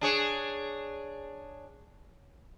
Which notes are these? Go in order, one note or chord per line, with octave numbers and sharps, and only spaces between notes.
D4 G#4 C#5